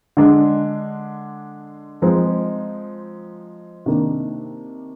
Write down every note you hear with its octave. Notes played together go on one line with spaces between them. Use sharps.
D3 G#3 D4
F3 G#3 C4 D#4
C3 D#3 A#3 D4